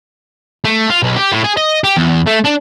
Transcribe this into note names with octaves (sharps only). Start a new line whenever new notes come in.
A3
F4
B1
G4
A2
G#4
D#5
G4
E2
A3
D4